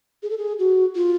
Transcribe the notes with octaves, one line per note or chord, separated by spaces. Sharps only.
G#4
A4
G#4
F#4
F4